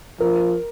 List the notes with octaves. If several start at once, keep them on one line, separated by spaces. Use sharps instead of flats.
F3 A#4